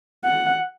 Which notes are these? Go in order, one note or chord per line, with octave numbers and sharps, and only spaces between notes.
F#5